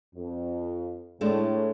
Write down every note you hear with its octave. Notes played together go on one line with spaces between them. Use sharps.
F2
A2 G#3 A3 D4